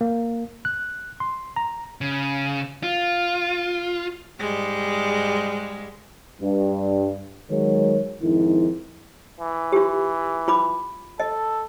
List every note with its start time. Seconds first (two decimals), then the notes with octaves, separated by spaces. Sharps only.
0.01 A#3
0.65 F#6
1.20 C6
1.56 A#5
2.01 C#3
2.83 F4
4.40 G#2 G3 G#3
6.40 G2
7.50 D#3 F#3 G#3 A#4 C#5
8.22 F2 G#2 D#3 E4
9.40 E3
9.72 F4 G4
10.48 F4 B5 D6
11.20 A4 D#5